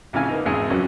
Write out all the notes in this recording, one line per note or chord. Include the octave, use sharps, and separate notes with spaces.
A1 F2 C#3 E4 F5 G#5
A#3 B3 D#4
G#1 E2 C#3 G#3 E4 G#5
G#1 F2 F#3 A#3 C#4